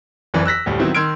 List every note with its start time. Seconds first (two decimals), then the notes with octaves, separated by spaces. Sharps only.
0.34 F#1 F2 E3 D5
0.46 E6 F#6 A#6 B6
0.66 D2 A2 G3
0.79 D#3 F#3 B3 C4 E4
0.95 D#3 C6 E6 F6 G#6 D7